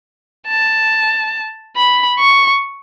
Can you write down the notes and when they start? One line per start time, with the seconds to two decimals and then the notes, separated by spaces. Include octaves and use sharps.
0.48 A5
1.76 B5
2.19 C#6